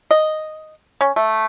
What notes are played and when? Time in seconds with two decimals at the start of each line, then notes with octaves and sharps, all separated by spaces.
0.11 D#5
1.01 C#4
1.16 A3